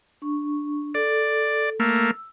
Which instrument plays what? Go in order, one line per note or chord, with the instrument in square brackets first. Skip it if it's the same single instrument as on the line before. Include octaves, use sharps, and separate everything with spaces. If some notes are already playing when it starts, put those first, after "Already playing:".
[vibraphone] D4 C#6
[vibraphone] A4 [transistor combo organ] D5
[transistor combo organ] A3 A#3 [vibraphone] E6